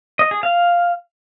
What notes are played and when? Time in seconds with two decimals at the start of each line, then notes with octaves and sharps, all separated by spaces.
0.19 D#5
0.31 G#4
0.43 F5